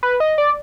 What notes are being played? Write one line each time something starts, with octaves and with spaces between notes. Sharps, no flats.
B4
D#5
D5